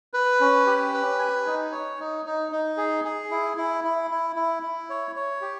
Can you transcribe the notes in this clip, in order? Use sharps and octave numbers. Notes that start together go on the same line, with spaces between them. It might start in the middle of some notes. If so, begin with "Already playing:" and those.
B4
C#4
G4
B4
G#5
D#4
C#5
D#4
D#4
D#4
G#4
G#4
E4
E4
E4
E4
E4
E4
C#5
C#5
G4